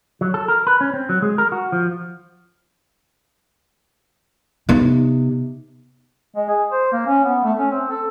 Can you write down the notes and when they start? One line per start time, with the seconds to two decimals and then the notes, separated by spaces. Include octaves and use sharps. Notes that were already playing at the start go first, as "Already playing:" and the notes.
0.21 F#3
0.34 A4
0.48 A#4
0.67 B4
0.81 C#4
0.93 C4
1.09 F#3
1.22 G#3
1.38 A#4
1.52 F#4
1.72 F3
4.69 C3 B3 D#4
6.36 G#3
6.48 G#4
6.72 C5
6.92 A#3
7.07 C#4
7.25 B3
7.44 A3
7.59 C#4
7.71 C4
7.90 A4